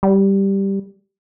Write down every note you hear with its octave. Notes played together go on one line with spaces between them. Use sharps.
G3